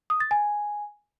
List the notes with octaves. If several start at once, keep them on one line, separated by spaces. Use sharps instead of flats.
D#6
A6
G#5